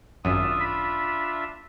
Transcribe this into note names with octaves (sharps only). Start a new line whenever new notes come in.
G#1 F#2 D4 F4 E5 D#6
B5